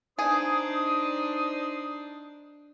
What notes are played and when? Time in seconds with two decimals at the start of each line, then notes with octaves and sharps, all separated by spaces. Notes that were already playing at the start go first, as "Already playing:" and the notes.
0.19 D4 D#4 G#4 C5 D#6